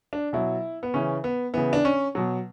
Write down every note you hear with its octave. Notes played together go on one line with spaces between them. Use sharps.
D4
B2 F#3 E4
B3
C#3 E3 C#4
B3
C#3 E3 B3
D4
C#4
B2 F#3